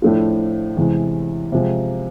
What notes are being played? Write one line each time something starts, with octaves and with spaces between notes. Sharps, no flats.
A2 F3 A3 D4 F4
E2 C3 E3 G#3
C3 F3 G#3